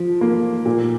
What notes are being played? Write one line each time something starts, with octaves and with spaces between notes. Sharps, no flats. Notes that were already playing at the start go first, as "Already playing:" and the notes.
Already playing: F3
A#3
A#2